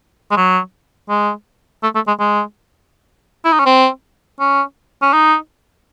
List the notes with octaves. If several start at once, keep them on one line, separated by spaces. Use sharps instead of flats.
G#3
F#3
G#3
A3
A3
G#3
G#3
E4
D#4
C#4
C4
C#4
C#4
D#4